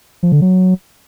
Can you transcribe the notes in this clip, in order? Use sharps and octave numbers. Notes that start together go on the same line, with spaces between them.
F3
D3
F#3